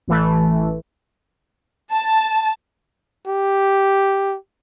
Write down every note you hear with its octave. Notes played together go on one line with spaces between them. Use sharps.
A1 E3 A3
A5
G4